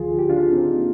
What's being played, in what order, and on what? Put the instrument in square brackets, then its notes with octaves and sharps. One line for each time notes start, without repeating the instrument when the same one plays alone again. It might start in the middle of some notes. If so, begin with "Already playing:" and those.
Already playing: [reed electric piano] D2 D3 F3 F4 G#4
G4
D4 F4
C4 D#4
A#3